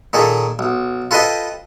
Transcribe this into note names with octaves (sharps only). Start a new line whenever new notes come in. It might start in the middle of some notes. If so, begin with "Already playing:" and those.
A#2 D#3 G#4 A4
B1
F4 A4 B4 C5 D#5 G5